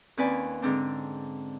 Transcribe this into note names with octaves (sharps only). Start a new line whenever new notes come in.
D#2 C4 C#4 B4 D5 G#5
G#2 D3 C4 D4